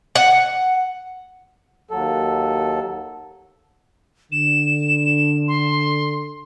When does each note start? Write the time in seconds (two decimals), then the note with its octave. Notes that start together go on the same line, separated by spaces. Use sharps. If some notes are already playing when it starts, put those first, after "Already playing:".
0.16 F#5
1.91 D#2 F#3 A4
4.32 D3 E7
5.48 C6